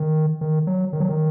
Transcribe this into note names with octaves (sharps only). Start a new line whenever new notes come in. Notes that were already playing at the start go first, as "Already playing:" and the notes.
Already playing: D#3
D#3
F#3
D#3
F#3
D#3